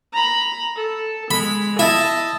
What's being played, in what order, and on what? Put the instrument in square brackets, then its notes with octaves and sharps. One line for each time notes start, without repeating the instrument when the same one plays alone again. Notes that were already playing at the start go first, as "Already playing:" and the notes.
[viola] A#5 B5
A4
[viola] G#3 [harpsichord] B5
[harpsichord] E4 [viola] D#5 A5